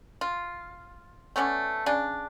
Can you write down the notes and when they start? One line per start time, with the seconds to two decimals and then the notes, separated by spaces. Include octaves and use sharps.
0.21 F4
1.36 A3 B3 C#4 D5
1.86 C#3 D4